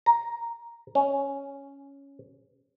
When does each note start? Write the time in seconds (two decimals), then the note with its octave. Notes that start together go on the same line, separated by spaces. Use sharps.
0.06 A#5
0.95 C#4